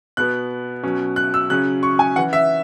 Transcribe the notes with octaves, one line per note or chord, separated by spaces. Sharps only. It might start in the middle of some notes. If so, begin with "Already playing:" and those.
B2 B3 F#6
B2 F#3 C#4
F#6
E6
C#3 F#3 C#4 F#6
C#6
G#5
E3 C#4 F#5
E5